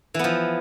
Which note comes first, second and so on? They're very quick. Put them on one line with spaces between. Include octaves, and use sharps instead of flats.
E3 B3 F3